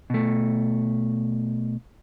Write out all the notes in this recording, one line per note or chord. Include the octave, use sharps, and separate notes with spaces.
B2 A3